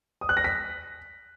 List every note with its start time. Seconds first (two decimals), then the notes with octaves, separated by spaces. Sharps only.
0.21 D#6
0.29 F#6
0.37 A#6
0.44 B6